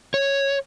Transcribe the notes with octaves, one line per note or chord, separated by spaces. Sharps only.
C#5